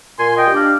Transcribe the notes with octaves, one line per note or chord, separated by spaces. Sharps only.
A#2 G#5 C6
D#5 G5
G3
D4 D5 F5